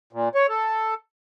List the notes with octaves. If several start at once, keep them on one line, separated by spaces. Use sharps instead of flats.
A#2
C#5
A4